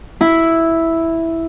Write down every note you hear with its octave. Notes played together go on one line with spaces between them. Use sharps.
E4